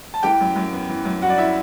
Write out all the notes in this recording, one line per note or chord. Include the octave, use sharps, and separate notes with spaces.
A5
E3 G4 G5
F#2
F#2
B3
E3
F#2
G3 F#4 F#5
D5
E4 E5